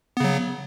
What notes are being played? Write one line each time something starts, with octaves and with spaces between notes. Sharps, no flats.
C#3 F#3 B3